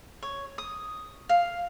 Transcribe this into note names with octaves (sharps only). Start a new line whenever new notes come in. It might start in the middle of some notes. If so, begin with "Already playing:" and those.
C#5
D#6
F5